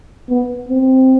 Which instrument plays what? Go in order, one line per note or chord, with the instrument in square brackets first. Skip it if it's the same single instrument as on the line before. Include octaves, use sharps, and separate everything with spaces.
[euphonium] B3
C4